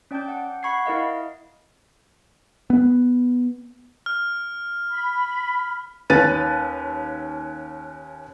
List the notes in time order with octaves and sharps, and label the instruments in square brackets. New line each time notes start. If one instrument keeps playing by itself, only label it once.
[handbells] C#4 D5 G5 A5 D6 G6
F#5
F#5 B5 C#6 G#6 C7
E4 A#4 D#5 F5
[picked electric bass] B3
[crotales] F6
[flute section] B5
[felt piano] D#2 C#4 B4 A6 D#7